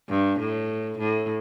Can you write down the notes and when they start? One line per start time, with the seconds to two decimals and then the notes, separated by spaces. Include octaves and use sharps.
0.10 G2
0.40 A2
0.99 A2